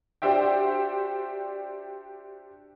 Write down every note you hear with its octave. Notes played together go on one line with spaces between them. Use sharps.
D4 F#4 G4 C5 E5 G5